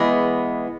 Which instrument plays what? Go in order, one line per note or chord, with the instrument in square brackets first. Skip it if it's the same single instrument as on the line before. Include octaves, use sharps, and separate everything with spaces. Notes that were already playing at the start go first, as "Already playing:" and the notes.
Already playing: [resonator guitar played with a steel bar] E3 G#3 B3